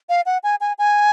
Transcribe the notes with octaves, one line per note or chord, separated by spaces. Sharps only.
F5
F#5
G#5
G#5
G#5